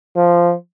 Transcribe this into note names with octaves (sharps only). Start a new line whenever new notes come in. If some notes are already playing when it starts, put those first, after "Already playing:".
F3